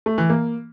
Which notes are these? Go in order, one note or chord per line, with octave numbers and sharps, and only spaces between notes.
A3
E3
A#3